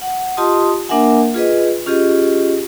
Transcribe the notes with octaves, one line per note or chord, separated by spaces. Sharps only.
F#5
F4 G4 D#5 A5 C6 D#6
A#3 D4 A#4 E5 F#5 G#5
F4 G#4 B4 D#5
C#4 F4 G4 G#4 D#5